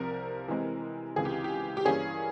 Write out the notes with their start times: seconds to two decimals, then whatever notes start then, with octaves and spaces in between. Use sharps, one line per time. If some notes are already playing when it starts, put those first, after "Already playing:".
Already playing: C2 C3 F3 C4 A#4
0.48 C3 E3 G#3 C4
1.16 C#2 C3 E3 G#4
1.25 G4
1.44 G4
1.77 G4
1.85 G2 E3 A#3 C#4 G#4